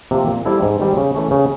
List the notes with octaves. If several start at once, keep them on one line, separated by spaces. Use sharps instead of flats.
C3 F3 A#3
A#2
G3 C4 E4 A4
G#2
D#3 G3 C4
C#3
E3 A3 C#4
C#3